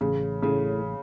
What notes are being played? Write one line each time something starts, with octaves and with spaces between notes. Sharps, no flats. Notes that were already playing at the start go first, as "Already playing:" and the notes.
A1 C#3
A2 C#3